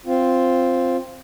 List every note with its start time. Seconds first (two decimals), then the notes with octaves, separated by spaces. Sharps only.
0.06 C4 F4